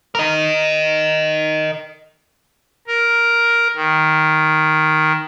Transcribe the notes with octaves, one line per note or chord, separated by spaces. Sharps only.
A#4 D#5
A#4
D#3